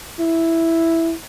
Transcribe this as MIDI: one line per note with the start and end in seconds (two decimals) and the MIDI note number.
0.20 1.14 64